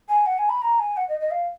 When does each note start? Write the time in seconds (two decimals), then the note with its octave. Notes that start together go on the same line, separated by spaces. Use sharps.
0.09 G#5
0.26 F#5
0.38 G#5
0.49 B5
0.62 A#5
0.79 G#5
0.97 F#5
1.09 D#5
1.20 D#5
1.31 F5